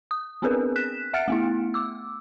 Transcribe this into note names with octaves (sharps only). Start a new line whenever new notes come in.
D#6
B3 C4 D4 G#4 A#4 B4
F#6 B6 E7
E5 F#5 F6 A6 C#7 D7
A3 B3 E4
D6 E6